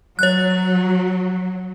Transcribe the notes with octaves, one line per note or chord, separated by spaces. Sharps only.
F#3 C#5 F#6